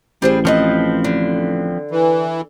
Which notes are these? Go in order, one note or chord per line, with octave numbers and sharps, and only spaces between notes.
A1 G3 C4 G#4
F3 C4 A4 B4 C#5 D#5
D3
E3